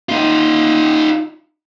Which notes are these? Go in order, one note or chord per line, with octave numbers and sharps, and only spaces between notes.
D#4 F4